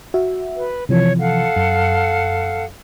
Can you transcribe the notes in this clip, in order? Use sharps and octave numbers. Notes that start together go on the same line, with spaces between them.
F#4 E5
B4
C3 E3 F3 C#5
A4 F5 F#5
F#2